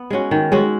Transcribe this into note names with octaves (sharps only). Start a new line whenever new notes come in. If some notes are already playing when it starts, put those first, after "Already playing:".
Already playing: B3
G#3 C#4 F#4
D#3
G#3 C#4 F#4